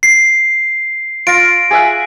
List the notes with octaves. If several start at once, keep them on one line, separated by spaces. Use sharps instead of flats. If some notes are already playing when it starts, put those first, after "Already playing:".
C7
F4 A#6 D7
G#4 E5 F#5